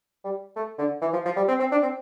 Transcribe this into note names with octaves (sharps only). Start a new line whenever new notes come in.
G3
A3
D3
E3
F3
F3
G3
C4
C4
D4
C4